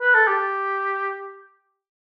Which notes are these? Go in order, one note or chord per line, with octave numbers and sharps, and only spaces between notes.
B4
A4
G4